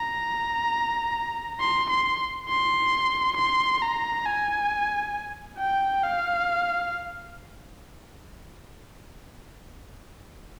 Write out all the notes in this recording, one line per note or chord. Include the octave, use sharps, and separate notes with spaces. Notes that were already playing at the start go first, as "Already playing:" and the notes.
Already playing: A#5
C6
C6
C6
C6
A#5
G#5
G5
F5